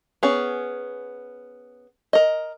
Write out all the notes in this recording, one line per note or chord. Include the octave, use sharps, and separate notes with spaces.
B3 C#4 G#4
A#4 D#5